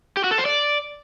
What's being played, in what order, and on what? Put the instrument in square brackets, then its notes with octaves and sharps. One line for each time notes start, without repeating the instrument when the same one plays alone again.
[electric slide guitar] G4
F#4
A4
C5
D5